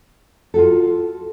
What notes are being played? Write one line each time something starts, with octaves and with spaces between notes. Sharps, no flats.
F4 F#4 A4